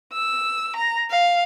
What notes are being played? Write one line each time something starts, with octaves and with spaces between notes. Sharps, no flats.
E6
A#5
F5